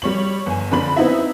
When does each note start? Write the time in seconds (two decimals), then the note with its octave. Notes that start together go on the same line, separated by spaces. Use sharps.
0.02 G3 C#5 F#7
0.46 G1 G#5
0.71 F#1 D3 D4 B5 F#7
0.96 B3 C4 D#4 E4 E5